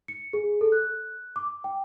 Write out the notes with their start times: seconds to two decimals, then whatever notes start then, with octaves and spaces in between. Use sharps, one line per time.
0.08 C#7
0.33 G#4
0.61 A4
0.72 F#6
1.36 D6
1.64 G5